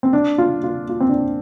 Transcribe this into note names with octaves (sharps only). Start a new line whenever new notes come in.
C4
D4
F4
F4
F4
C4
D4